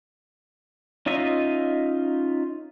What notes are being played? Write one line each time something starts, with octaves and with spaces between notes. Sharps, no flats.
C#4 D#4 F4 D#5 E5